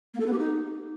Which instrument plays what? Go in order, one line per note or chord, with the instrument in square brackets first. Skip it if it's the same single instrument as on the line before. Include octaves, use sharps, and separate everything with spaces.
[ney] A#3
A4
B3
G4
D#4